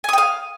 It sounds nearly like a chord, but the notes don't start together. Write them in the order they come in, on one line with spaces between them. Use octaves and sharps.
G#5 D#6 G5 F5